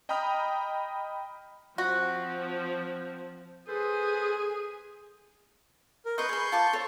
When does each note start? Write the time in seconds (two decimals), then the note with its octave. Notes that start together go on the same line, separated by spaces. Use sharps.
0.09 D#5 G5 A#5 B5 D#6 F6
1.78 F3 C4 F#4
3.68 G#4 A4 B4 C5
6.06 A#4
6.18 B4 D#5 C6 C#6 G6
6.29 G#4 B5
6.52 F4 A5 D6
6.73 A4 C5 C#5